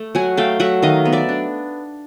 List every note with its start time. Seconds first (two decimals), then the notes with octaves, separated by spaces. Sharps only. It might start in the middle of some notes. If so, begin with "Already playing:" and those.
Already playing: A3
0.15 F#3 F#5 G#5
0.37 A3 F5 G5
0.60 F#3 E5 F#5
0.82 D#3 D#5 F5
1.05 B3
1.12 D5 E5
1.29 D4